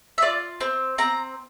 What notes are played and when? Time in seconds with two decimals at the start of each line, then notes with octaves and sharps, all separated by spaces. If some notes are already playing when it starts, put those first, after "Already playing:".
0.18 E5
0.22 F4 D5
0.61 C4
0.98 C4 A#5